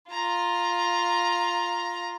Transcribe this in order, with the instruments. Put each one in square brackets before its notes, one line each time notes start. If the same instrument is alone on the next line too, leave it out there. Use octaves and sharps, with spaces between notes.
[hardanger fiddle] F4 A#5